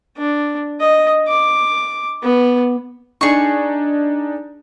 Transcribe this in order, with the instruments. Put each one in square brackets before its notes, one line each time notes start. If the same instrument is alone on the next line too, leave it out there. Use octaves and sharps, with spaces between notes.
[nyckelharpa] D4
D#5
D6
B3
[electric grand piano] D4 D#4 [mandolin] G#4 C#6